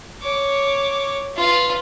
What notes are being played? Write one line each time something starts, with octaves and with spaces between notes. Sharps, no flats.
C#5 D6
F4 B4